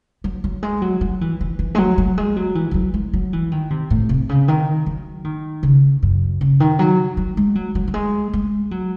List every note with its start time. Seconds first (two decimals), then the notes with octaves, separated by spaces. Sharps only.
0.24 F#3
0.44 F#3
0.63 G#3
0.82 F#3
1.01 F#3
1.21 E3
1.41 E3
1.59 E3
1.75 G#3
1.78 F#3
1.98 F#3
2.18 G#3
2.37 F#3
2.55 E3
2.71 E3
2.74 F#3
2.94 G#3
3.13 F#3
3.33 E3
3.52 D#3
3.70 C3
3.90 A2
4.09 C3
4.29 C#3
4.48 D#3
4.86 F#3
5.24 D#3
5.63 C#3
6.02 F#2
6.41 C#3
6.60 D#3
6.79 F#3
7.17 F#3
7.37 G#3
7.55 F#3
7.75 F#3
7.88 F#3
7.94 G#3
8.33 G#3
8.71 F#3